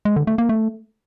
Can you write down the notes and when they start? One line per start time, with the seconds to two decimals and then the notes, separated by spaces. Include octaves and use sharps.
0.05 G#3
0.16 D3
0.27 A3
0.38 A#3
0.49 A3